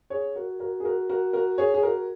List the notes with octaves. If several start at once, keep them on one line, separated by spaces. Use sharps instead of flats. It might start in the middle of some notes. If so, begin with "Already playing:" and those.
G#4 C#5
F#4 A#4
F#4 A#4
G#4
F#4 A#4
F#4 A#4
F#4 A#4
G#4 C#5
G#4
F#4 A#4